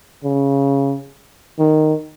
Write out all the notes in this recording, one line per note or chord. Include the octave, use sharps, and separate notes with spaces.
C#3
D#3